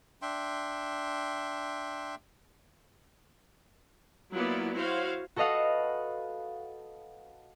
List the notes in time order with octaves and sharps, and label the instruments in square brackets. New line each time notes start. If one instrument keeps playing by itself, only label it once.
[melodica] D4 E5 G5 C6
[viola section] F#3 A#3 B3 E4 F4 D5
E4 F#4 C5 C#5 F5
[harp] F#4 A4 B4 D#5 F5 F#5